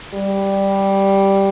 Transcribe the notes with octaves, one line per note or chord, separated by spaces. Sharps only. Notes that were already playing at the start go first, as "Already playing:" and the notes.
G3